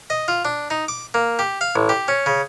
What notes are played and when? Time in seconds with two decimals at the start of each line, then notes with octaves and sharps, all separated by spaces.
0.10 D#5
0.28 F4
0.45 D4
0.70 D#4
0.88 D6
1.14 A#3
1.39 G4
1.61 F5
1.76 A1
1.89 G4
2.08 C#4
2.26 C#3